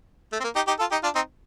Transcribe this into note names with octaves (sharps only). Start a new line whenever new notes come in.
A3
C4
A#3
D#4 G4
D#4 G4
F4 A4
D#4 G4
D4 F4
C4 D#4